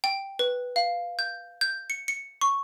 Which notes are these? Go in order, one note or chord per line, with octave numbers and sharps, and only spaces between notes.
G5
B4
F5
G6
G6
C#7
C#7
C#6